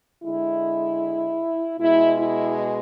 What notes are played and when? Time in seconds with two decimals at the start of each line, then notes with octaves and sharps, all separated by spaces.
0.23 D3 G#3 E4
1.79 B2 G#3 E4
2.18 E4